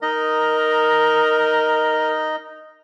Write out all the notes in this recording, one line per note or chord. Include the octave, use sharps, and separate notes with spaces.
D#4 A#4 D#5